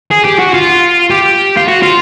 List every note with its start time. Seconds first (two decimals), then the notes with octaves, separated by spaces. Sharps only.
0.11 G#4
0.25 G4
0.39 F#4
0.54 F4
1.10 G4
1.57 F4
1.68 F#4
1.83 F4